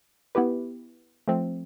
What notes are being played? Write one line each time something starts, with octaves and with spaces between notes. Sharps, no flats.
B3 E4 G4 B4
F3 A3 C4